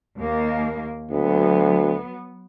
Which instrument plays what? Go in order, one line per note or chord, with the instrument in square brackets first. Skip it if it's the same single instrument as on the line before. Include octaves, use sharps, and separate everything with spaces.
[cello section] D#2 A#3
[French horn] D2 [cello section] F#3 B3